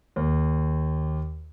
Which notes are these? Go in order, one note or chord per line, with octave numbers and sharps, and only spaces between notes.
D#2